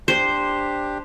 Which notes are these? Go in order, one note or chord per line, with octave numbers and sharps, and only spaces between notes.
D4 G4 C5